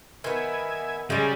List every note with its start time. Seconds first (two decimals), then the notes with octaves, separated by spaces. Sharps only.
0.24 D#3 B3 E5 G#5
1.10 C#3 G3 G#3 G#5